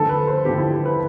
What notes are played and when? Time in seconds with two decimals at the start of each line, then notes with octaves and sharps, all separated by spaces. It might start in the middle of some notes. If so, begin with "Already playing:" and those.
Already playing: G2 D3 F3 A3 A4
0.09 B4
0.27 C5
0.45 G2 D3 F3 A3 G4
0.58 E4
0.72 G4
0.86 B4